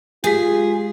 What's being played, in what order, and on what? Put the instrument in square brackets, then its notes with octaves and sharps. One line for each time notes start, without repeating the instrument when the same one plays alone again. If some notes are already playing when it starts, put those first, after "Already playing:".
[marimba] G#3 G4 [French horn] F4 [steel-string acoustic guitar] G#4